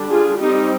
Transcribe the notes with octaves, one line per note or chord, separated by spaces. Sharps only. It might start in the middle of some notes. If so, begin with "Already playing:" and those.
Already playing: D3 G3 D4
F4 G#4
G3 C4 D#4 G4